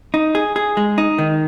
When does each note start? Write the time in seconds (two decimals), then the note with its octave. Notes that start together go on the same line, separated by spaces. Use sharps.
0.14 D#4
0.35 G#4
0.56 G#4
0.77 G#3
0.98 D#4
1.19 D#3